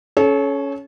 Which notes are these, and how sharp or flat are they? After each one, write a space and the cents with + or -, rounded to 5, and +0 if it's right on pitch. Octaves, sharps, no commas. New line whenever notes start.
C#4 +10 A4 -35 C#5 +0